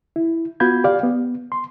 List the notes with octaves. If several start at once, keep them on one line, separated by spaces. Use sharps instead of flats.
E4
B3 F4 F#4 B5 G6 G#6
G4 D5 F5
B3
C6